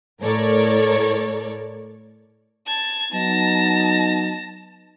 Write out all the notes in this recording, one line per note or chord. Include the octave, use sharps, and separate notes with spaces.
A2 A4 A#4 C#5 D5
A5 G#6
F#3 B3 D#4 A5 A#6